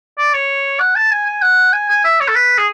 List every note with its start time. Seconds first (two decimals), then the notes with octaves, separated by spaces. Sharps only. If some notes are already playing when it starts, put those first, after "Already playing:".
0.18 D5
0.34 C#5
0.80 F#5
0.96 A5
1.11 G#5
1.27 G#5
1.42 F#5
1.73 G#5
1.89 G#5
2.04 E5
2.20 C#5
2.28 A4
2.35 B4
2.58 G#4